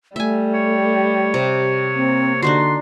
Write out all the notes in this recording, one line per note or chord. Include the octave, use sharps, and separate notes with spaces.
G3 A3 E5 G#5
C#5
C3
A#3 C4
D3 D4 D#4 F#4 C6